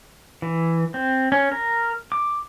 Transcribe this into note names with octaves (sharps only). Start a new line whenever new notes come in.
E3
C4
C#4
A#4
D6